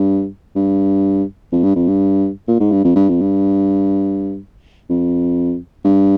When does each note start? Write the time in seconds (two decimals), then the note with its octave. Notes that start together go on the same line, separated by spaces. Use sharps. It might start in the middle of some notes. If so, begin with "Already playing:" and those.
Already playing: G2
0.56 G2
1.52 F2
1.63 G2
1.76 F2
1.87 G2
2.48 A#2
2.60 G#2
2.72 G2
2.84 F2
2.96 G2
3.09 F2
3.20 G2
4.90 F2
5.85 G2